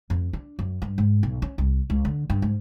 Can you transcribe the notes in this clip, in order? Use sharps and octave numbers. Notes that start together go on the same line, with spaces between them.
F2
D4
F#2
G2
G#2
B1
C#4
C2
C#2
D3
G2
G#2